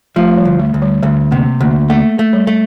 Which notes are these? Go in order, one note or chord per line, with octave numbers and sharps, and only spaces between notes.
F3 A3
A3
G3
D2
A3
D2
G3
D2 A3
C3 A#3
D2 A#3
A3 A#3
A3
G3
A3